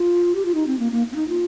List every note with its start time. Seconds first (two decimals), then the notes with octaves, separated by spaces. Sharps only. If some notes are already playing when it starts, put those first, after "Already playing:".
Already playing: F4
0.35 G4
0.45 F4
0.55 D#4
0.67 C4
0.79 A#3
0.92 A#3
1.12 C4
1.16 D#4
1.28 F4